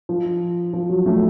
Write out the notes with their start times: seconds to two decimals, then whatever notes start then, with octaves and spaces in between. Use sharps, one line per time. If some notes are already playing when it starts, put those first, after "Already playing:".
0.09 F3
0.73 F3
0.89 F#3
1.06 A3